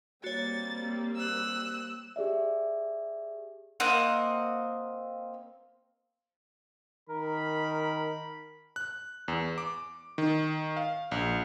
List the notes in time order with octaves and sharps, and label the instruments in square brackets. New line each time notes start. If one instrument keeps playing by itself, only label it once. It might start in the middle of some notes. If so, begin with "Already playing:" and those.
[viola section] G3 A#3 C4 [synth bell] F#4 C#5 [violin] A6
[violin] E6 F#6
[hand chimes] G4 G#4 D5 E5
[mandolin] A#3 C4 D#5 F#5
[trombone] D#3 [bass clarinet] A#4 [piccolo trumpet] B5
[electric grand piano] F#6
E2
D6
D#3
F5
A#1